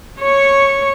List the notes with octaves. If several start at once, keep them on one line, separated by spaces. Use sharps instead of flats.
C#5 C#6